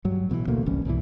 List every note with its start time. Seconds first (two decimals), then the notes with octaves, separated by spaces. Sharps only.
0.05 G2 F#3
0.30 A1 B2 D3 E3
0.47 D2 B2 A3 A#3
0.66 G1 C2 E3 C#4
0.85 C2 G#2 B2 E3